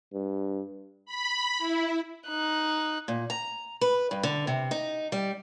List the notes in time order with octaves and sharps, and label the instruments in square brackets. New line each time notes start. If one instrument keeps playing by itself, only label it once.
[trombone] G2
[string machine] B5
E4
[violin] D#4 F#6
[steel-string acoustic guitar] A#2
A#5
B4
G2
D3
C3
D#4
G3